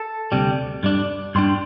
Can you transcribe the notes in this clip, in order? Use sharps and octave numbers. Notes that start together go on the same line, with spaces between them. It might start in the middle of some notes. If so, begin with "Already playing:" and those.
Already playing: A4
D2 C3 G3
G2 G3 D4
G2 G3 D4 C6